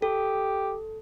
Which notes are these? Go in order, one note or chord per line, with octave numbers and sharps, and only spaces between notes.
G4 A4